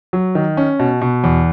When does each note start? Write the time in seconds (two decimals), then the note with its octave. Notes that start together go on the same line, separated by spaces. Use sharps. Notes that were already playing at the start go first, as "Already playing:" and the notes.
0.13 F#3
0.35 D#3
0.57 C#4
0.80 B2
1.02 B2
1.24 E2